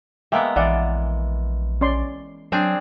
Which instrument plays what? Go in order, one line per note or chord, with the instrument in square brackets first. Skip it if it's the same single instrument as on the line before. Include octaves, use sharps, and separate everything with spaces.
[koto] G#3 A#3 B3 [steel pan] E5 G5 D6
[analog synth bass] A#1 [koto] E3 [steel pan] D5 F5 F#5
[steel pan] C#4 D5 C6
[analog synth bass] F#3 [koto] C4 D4 G#4